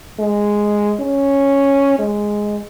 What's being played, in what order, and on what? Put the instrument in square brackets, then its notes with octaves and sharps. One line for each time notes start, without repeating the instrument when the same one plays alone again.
[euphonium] G#3
C#4
G#3